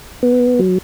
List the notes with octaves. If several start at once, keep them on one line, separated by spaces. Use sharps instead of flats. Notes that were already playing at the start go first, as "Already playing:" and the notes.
B3
F#3